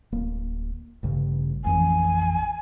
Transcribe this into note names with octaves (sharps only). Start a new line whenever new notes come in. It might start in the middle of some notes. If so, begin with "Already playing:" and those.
D1 A#3
A1 G2 C#3
A1 F2 E3 G#5